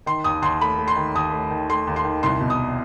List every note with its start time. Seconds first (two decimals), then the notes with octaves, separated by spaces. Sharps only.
0.06 D#3 C6
0.24 D#2 D#6
0.42 D#2 C6
0.61 A3 B5
0.79 A3
0.88 C6
0.96 D#3
1.15 D#2 D#6
1.33 A3
1.50 D#3
1.69 A3 C6
1.87 D#2
1.96 C6
2.05 D#3
2.23 C2 C6
2.41 B2
2.50 D#6